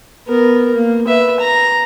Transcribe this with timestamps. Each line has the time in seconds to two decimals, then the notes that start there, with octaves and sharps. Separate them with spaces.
0.27 B3 A#4
0.75 A#3
1.07 B4 E5
1.40 A#5